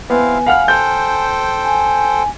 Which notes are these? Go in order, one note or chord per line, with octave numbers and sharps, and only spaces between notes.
B3 C4 E4 F5 G#5
F5 F#5 B5 F6
A4 C5 G5 G6
G#5